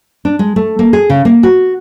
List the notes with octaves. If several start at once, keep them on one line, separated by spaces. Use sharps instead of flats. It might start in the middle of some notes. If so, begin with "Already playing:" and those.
D4
G#3
A3
A#3
G#4
C#3
A#3
F#4